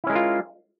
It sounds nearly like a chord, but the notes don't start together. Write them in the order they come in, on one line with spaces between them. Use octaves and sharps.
E4 C#4 G#3 A#4 F4